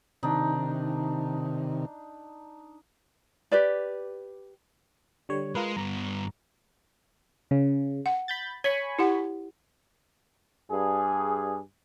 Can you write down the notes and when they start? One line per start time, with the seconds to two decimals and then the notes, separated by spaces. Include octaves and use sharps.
0.23 C3 D#3 D4 D#4
3.51 G4 B4 D5
5.29 D3 G3 C#5
5.55 G#3 F4 A#4 B4
5.77 G2 B3 A#5
7.51 C#3
8.06 F#5
8.28 B5 G6 A6
8.64 C#5 G#5 B5 C#6
8.99 E4 G4 F#5
10.71 G2 G#4